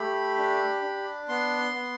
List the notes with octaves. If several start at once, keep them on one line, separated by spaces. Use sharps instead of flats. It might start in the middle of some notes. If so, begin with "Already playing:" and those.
Already playing: A3 G4 B5
D4
D4
B3 C6
B3